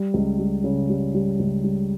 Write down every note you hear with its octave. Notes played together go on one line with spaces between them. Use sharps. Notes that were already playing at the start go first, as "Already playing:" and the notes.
Already playing: G3
C#2
G3
C#3
G3
G3
C#2
G3